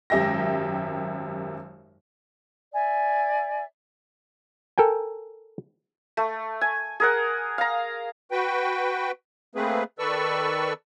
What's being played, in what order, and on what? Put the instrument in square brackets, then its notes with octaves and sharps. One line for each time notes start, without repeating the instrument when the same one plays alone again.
[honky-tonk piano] G#1 F#2 G4 E5 G5 A#6
[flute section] D5 E5 G#5
[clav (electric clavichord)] A4 A#4 G5 G#5
[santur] A3
G#5
G#4 A#4 F#5
F5 A#5
[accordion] F#4 B4 G5
A3 A#3 C4 G#4 B4
D#3 A4 B4 D5 C#6 E6